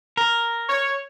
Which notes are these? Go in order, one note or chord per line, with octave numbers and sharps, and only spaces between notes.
A#4
C#5